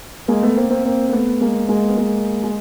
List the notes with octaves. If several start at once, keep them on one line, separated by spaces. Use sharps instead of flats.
G#3 A#3
A3 B3
A#3 C4
A#3 C4
A#3 C4
A#3
A3 B3
G#3 A#3
G#3 A#3
B3
G#3 A#3
G#3